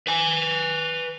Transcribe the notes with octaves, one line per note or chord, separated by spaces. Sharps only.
B4 G#5